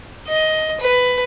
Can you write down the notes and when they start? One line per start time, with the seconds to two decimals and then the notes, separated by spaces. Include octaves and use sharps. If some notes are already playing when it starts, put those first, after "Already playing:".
0.27 D#5
0.80 B4